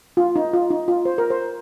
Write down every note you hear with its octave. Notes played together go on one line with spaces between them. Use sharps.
F4
D#4
F4
D#4
F4
C5
A#4
C5